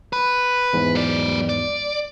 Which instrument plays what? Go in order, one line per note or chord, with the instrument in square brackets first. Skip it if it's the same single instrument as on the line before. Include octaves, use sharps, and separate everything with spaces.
[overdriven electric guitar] B4
[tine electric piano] E2 G#2
[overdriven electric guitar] F#3 D5
D5